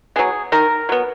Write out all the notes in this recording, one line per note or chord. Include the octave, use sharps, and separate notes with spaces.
F#3 B3 G#4
D#3 A#4
F#3 B3